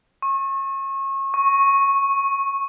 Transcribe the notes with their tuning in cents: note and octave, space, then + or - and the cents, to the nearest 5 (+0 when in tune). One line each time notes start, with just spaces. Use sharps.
C#6 -30
C#6 -10